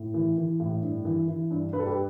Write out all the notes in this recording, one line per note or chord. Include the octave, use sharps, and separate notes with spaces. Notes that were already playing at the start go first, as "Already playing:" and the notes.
Already playing: A2
E3
E3
A2
G2
E3
E3
G2
G2 B4
A4
G4 B4